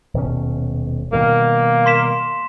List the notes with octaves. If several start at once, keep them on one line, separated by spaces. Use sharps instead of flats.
D#1 B2 C#4
B2 D#3 G3 A#3
C6 B6 E7